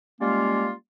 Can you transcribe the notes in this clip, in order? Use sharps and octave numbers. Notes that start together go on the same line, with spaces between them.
G3 G#3 A#3 C#4 F4